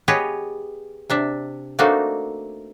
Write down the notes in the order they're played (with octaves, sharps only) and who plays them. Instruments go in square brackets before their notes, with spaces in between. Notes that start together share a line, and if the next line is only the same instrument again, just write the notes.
[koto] B3 G4 G#4 B4 C#5 D#5
C3 D4 E5
A3 A#3 C4 D4 D#4 F#4